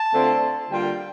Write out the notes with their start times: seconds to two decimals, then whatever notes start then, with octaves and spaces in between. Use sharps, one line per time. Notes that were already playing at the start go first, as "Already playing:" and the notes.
Already playing: A5
0.13 D3 A3 C4 F4
0.69 D3 G3 A#3 F4 G5